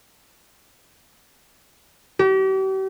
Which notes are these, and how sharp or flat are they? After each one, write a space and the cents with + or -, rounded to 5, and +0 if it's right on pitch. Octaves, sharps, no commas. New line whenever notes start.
G4 -40